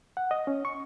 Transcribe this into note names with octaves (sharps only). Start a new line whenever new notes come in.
F#5
D#5
C#4
C#6